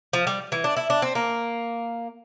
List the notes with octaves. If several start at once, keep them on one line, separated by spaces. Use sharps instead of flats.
F3
G3
E3
D4
E4
D4
C4
A#3